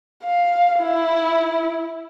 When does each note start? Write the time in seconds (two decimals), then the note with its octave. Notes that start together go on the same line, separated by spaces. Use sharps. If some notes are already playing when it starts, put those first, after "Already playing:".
0.24 F5
0.80 E4